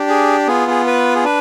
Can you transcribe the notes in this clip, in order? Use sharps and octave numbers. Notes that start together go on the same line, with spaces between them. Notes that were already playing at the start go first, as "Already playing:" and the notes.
Already playing: D4 G4
G#4
B3 F4 G#4
G#4
B4
G#4
D4 B4